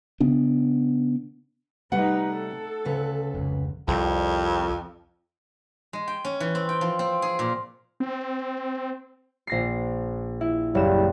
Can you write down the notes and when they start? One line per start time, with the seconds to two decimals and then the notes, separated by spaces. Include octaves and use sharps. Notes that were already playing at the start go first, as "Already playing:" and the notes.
0.20 C#3 B3 D4
1.92 C3 G3 A3 D#4 B4 F#5
2.31 A4
2.85 D2 C#3 B4
3.34 F1 C#2
3.88 C2 F2
5.93 G#3
6.08 G5
6.25 C#4
6.40 E3
6.55 C4
6.69 G5
6.81 F3
6.99 C4
7.22 G#4
7.39 A#2
8.00 C4
9.47 A#1 A#6 C7
10.41 E4
10.75 F#1 G3 E7